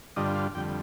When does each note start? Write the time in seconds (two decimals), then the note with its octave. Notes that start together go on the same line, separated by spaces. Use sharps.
0.16 G2 D3 G3 D4 F4 D#5
0.35 F5
0.55 F2 D3 G3 G5